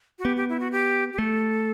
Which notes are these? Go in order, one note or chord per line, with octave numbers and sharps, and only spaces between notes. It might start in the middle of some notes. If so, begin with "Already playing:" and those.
F#4
B3 G4
G4
E4
F#4
G4
G4
A3 A4